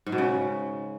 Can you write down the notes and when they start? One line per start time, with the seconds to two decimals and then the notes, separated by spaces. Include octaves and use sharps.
0.06 G#2
0.12 B2
0.18 C#3